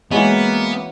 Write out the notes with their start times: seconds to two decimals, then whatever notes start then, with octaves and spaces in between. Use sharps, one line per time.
0.11 E3 F#3 G#3 A#3 B3 C#4